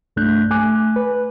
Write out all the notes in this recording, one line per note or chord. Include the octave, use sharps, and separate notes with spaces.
C2 G2 A3 D4 F#6 G6
A3 G#5 D6 F#6
B4